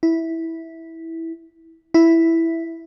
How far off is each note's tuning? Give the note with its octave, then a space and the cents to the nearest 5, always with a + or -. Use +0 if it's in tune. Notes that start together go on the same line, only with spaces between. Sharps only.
E4 -10
E4 +0